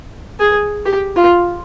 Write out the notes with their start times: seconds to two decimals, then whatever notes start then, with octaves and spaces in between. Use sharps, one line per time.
0.40 G#4
0.86 G4
1.17 F4